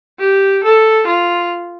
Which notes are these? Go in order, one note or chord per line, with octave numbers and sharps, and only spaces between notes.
G4
A4
F4